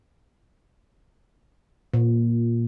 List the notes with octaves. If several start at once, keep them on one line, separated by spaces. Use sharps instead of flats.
A#2